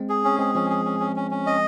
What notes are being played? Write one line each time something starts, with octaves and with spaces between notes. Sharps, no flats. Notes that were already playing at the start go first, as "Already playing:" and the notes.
Already playing: G#3 C4
G#4
C#4
G#3 C4 G#4
F3 G#3 C#4
G#4
C#4
C#4
C#4
C#4
D#5